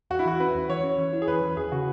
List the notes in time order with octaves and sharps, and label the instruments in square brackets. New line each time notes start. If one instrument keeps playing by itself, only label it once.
[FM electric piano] E2 [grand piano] F#4
[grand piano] E4
[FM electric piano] E3 [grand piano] F#4
[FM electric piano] C#4 [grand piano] B4
[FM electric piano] E2
[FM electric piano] E3 [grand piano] C#5
[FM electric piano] C#4
E3
E4
[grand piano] G#4
[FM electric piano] E2 [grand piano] B4
[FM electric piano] E3
[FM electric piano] E2 [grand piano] G#4
[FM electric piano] C#3 [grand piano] F#4